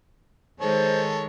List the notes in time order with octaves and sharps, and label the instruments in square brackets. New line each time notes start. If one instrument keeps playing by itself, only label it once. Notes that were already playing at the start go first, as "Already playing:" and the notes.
[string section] D#3 G#3 [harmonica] A4 C#5 [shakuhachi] C5